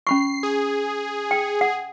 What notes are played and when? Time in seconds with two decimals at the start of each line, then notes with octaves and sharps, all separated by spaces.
0.07 C#4 B5 C#6 C7
0.43 G#4
1.31 G5
1.61 F#5